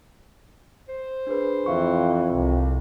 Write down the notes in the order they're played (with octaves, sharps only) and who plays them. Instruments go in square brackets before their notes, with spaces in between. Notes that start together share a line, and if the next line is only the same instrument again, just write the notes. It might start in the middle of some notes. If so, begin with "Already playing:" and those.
[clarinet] C5
[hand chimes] D4 G#4 B4
[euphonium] F2 [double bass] E3 [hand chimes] E5 F5 C#6
[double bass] C2